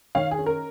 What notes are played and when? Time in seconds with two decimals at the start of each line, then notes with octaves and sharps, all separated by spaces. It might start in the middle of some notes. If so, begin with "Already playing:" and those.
0.15 D#3 C#5 F5
0.31 G#4
0.39 C#4
0.46 A#4